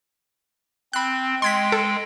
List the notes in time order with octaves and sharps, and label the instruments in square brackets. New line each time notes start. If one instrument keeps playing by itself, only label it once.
[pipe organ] C4 [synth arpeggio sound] B5 F#6
[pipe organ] G#3 G5 [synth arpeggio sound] C6 G#6 B6
[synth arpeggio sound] A4